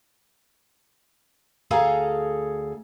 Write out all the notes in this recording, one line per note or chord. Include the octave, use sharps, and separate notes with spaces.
D2 G#4 A4 F5 G#5 A#5